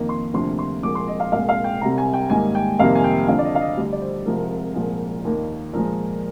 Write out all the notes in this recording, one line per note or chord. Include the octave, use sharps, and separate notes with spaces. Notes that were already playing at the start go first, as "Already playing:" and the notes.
Already playing: F2 D#3 A#3
C6
D2 C3 F3 A#3 C6
C6
C2 A#2 F3 G#3 D6
C6
D#5
F5
C2 A#2 G#3 F5
F5
G5
C2 C3 G3 A#5
G#5
G5
G#2 D#3 G3 A#3 G#5
G5
F2 C3 D#3 G3 A#3 F5
G#5
G5
F2 D3 F3 F5
D5
D#5
F5
D#5
D2 D3 G3
D5
C5
C2 C3 F3 G#3 A#4
C2 A#2 F3 G#3
D#2 D#3 A#3
A#2 F3 G#3 A#4